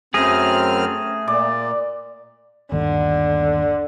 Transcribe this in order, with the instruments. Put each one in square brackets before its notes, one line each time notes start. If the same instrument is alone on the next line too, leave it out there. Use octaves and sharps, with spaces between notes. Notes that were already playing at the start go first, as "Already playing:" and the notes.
[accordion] F#2 C4 F6 [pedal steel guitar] A3 G#4 [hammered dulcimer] A#5
[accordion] A#2 [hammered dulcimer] D5
[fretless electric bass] G1 D#2 [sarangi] D3